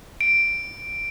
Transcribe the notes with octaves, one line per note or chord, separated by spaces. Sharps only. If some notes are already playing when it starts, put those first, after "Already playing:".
D7